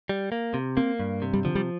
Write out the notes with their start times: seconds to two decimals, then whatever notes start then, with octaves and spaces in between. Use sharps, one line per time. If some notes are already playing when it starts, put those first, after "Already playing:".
0.09 G3
0.32 A#3
0.54 C3
0.77 A#3 C4
1.00 G2
1.22 C3
1.33 G3
1.45 D3 F3
1.55 G3